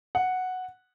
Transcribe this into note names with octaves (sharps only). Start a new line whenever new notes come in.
F#5